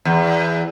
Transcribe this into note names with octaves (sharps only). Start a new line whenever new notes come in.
E2